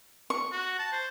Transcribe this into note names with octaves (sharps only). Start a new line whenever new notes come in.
C#6
F#4
A5
C5